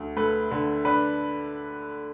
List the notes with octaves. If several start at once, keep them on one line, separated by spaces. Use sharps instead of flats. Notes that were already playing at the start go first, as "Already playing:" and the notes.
Already playing: D2
A3 B4 B5
D3
D4 B4 B5